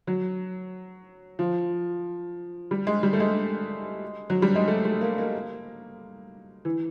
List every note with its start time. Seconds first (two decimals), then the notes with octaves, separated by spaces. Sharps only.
0.07 F#3
1.39 F3
2.71 G3
2.87 G#3
3.03 G3
3.13 A3
3.20 G#3
4.30 F#3
4.42 G3
4.55 G#3
4.68 A3
4.85 A3
5.01 A#3
5.18 A#3
6.65 E3